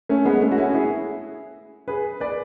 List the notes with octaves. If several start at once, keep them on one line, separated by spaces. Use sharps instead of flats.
A3 C#4
G#3 B3
A3 C#4
F#4
C#4 E4
E4 G#4
G#4 B4
B4 D5